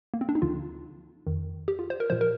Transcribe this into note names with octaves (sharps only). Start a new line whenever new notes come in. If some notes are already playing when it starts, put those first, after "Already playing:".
A#3
C4
D4
D#4
D2 D3 F3 F4
F2 D#3
G4
F4
C5
A#4
A#2 F3 C5
A#4